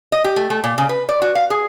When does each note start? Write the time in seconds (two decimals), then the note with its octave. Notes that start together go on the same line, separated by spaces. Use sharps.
0.12 D#5
0.24 G4
0.36 A3
0.50 A3
0.64 A#2
0.78 C#3
0.89 B4
1.09 D5
1.22 F#4
1.35 F5
1.50 G#4